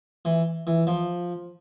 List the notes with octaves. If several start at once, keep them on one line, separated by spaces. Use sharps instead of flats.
E3
E3
F3